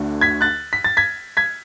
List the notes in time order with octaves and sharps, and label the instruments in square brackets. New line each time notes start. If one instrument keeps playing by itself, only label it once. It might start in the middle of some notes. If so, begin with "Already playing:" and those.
Already playing: [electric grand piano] D2 D3 A3 D4 F#4
[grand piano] G#6 B6
F#6 A6
B6
A6
G#6 B6
G#6 B6